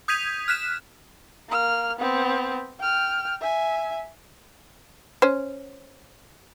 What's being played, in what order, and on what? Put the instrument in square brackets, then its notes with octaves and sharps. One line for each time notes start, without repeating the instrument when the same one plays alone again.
[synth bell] D#6 G6 G#6 B6 D#7 F7
F6 F#6 B6 E7
[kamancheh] A#3 F6
B3 C4
G5 F6
E5 G#5
[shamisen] C#4 C5